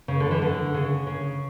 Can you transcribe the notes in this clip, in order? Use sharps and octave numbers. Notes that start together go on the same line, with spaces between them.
C#3
D3
E3
D3
C#3
C#3